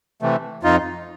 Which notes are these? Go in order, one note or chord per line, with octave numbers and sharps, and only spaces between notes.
C3 E3 A3
F2 D#4 F4